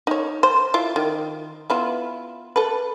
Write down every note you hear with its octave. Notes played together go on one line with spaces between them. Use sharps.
D#4 C#5
C5
E4 F4
D#3
B3 E4 F4
A4 B4